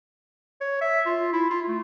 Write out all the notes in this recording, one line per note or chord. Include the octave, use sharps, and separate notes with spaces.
C#5
E5
F4
E4
F4
A3